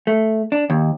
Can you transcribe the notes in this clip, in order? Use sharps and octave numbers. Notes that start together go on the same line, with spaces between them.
A3
D4
D#2